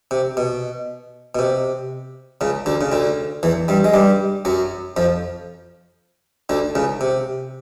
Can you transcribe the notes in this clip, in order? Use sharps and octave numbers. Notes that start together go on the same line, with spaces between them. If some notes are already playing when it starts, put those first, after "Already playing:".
C3
B2
B2
C3
C#2 C#3
D2 D3
C#3
D2 D3
E2 E3
G2 G3
G#3
G2 G3
F#2 F#3
F2 F3
D2 D3
C#2 C#3
C3